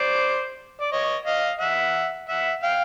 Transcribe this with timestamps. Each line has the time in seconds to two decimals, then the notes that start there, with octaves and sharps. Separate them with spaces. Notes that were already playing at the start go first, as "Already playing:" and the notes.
Already playing: C5 D5
0.81 D5
0.92 C#5 D#5
1.26 D#5 F5
1.60 E5 F#5
2.29 E5 F#5
2.63 F5 G5